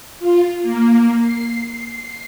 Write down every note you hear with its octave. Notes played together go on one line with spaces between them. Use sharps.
F4
A#3
C7